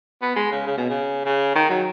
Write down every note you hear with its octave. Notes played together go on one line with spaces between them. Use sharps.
B3
G#3
C#3
C#3
B2
C#3
C#3
D#3
F#3